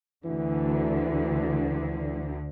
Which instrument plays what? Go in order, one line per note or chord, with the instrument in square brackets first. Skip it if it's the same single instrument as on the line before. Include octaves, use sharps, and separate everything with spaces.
[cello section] D2 D3 [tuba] E3